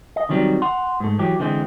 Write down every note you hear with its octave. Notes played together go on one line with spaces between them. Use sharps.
D#5
D3 D#3 F#3 G3 C4 D#4
F#5 C6
G#2 A3
E3 F#3 G4
D3 E3 G#3 C4